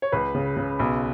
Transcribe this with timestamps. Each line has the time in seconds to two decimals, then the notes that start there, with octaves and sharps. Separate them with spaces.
0.02 C#5
0.12 C#2 B4
0.35 C#3
0.57 C#3
0.79 B1